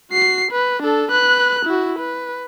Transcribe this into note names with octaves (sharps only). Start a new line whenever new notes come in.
F#4 C7
B4
D4 A4
B4 F#6
E4 F#4
B4